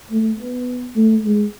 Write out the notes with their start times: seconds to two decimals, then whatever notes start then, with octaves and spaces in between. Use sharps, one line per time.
0.10 A3
0.38 B3
0.95 A3
1.23 G#3